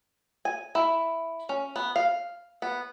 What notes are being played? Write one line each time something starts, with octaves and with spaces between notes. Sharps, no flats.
G#5
E4
C#4
B3
F5
B3